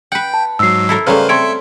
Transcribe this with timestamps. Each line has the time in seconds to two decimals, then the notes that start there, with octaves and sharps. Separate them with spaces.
0.12 B4 F#5 G5
0.34 A5
0.59 G#2 F#3 E6 C7
0.89 E4 A4 A#4
1.07 C#3 G3 A3 B4 C5 F5 A#5 F6
1.29 C4 A4 C#5 E5 C6 G#6 D7